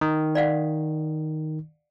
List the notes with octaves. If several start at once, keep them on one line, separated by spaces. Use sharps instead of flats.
D#3
D5 F5 F#5